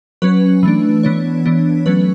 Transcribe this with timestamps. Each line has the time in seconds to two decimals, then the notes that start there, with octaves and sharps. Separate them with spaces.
0.22 F#3 C#4 B4
0.63 E3 A3 D4
1.03 E3 B3 D4 C#5
1.45 E3 B3 D4
1.86 F#3 A3 C#4 B4